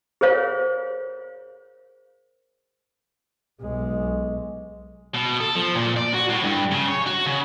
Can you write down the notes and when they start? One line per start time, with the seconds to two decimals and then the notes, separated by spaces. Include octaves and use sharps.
0.21 G#4 A#4 C5 C#5 F5
3.61 B1 G#3
5.14 B2
5.40 A4
5.55 F3
5.75 A#2
5.97 D5
6.14 F#4
6.30 A2
6.44 G2
6.72 C#3
6.88 C#5
7.07 F#4
7.26 C#3